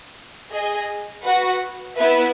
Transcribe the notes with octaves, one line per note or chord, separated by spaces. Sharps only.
G#4 D#5 G#5
F#4 B4 F#5
B3 E4 B4 E5